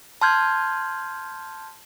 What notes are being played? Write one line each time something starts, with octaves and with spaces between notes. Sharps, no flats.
A5 C6 F6 G6 G#6